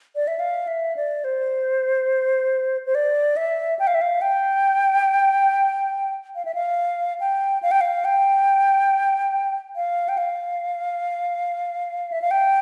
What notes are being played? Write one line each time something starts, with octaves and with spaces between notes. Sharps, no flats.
D5
E5
F5
E5
D5
C5
C5
D5
E5
G5
F5
E5
F5
G5
F5
E5
F5
G5
F5
G5
F5
G5
F5
G5
F5
E5
F5
G5